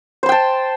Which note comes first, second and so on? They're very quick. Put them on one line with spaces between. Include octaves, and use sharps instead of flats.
C5 C6 G5 A5